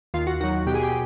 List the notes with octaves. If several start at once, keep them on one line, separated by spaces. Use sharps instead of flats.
D#2 F4
F#4
D#3 F#3 F#4
B2 G4
G#4
G4